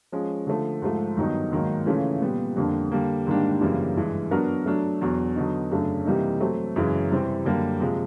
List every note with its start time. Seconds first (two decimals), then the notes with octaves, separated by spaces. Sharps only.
0.12 F3 G#3 C#4
0.47 D3 F3 A3
0.82 G#2 F3 A3
1.16 G2 D#3 F#3 B3 D#4
1.52 G#2 D#3 F#3 A#3 D#4
1.86 C#3 E3 A3 C#4 F4
2.22 A#2 G3 B3
2.56 F2 D3 G3 A#3 D4
2.91 D3 G3 A#3
3.27 G#2 D#3 G3 A#3 D4
3.61 F#2 C#3 E3 G3 A#3
3.96 G2 E3 G#3
4.31 F#3 B3 D4 F#4 A#4
4.66 F#3 A3 D4
5.01 E2 B2 F#3
5.36 D3 F#3 B3 D#4
5.71 F#2 C#3 F#3 A3 D4
6.06 C3 E3 G3 A#3 D#4
6.40 F#3 A3 C4
6.76 F#2 C#3 E3 G#3
7.11 C3 E3 G3 C4
7.45 F#2 D3 G3 A#3
7.80 C3 F3 G#3